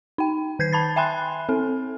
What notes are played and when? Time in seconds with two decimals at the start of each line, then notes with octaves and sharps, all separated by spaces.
0.18 D#4 G5
0.59 D#3 G6 G#6 C7
0.73 A5 B5 A6
0.96 E5 G5 G#5 B5 C6 F#6
1.49 C4 A4